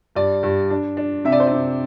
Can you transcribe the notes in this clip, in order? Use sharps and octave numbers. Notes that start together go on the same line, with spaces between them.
G2 D5
G2
D4
D4
C3 E5
D5
C5
C3 D5